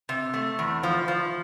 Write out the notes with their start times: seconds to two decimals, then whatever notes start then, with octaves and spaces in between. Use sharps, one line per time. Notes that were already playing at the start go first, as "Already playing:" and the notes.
0.09 C3
0.34 A3
0.59 E2
0.83 F3
1.08 F3